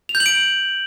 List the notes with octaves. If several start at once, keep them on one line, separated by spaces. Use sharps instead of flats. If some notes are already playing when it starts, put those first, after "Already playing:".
F7
G6
F#7
D7